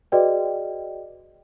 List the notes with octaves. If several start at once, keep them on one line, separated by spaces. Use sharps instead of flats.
F#4 G#4 B4 D5 D#5 G5